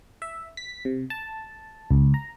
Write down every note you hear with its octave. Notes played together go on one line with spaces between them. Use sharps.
E5
B6
C3
A5
C#2
A#5